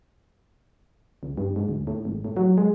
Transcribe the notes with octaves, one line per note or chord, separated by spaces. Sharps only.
C#2
G2
G#2
D2
A2
G#1
A2
F#3
G#3